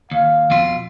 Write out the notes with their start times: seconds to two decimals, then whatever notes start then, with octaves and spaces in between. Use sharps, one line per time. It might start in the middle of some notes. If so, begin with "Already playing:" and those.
0.11 D#2 F5
0.50 F2 B2 F4